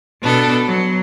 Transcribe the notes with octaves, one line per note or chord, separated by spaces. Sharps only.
B2 B3 D4 A4
F#3